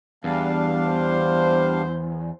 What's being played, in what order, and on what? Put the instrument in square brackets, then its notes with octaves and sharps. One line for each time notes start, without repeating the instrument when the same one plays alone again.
[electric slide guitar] E2 [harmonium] G3 D4 F5
[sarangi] C5